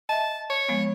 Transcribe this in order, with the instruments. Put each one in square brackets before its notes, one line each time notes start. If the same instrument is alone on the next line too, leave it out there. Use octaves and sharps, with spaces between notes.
[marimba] D#5 E5 [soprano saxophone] A5
[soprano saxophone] C#5
[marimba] F3 G#3 B3